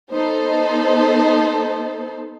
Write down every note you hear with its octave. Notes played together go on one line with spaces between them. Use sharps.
B3 D#4 A4 C5